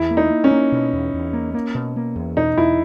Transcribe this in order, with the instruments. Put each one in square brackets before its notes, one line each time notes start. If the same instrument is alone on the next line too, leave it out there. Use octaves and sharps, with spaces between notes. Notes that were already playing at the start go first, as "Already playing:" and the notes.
Already playing: [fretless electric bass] E2 [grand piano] E4
[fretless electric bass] A#3
[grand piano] D#4
[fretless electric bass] A#3
[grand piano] C#4
[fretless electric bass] A#3
B2
E2
E2
A#3
A#3
B2
A#3
E2
[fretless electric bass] B2 [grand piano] D#4
[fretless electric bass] E2 [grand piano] E4